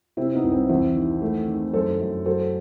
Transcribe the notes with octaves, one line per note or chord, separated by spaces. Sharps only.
C3 C4 E4
B3 D#4
C2
C4
E2 C4 E4
D#3
A3
D#3
F#2 A4 C5
F#2
F#3 A4 C5